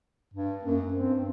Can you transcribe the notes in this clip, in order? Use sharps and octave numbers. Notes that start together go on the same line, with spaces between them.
G2
F#2 A#3
G2 C4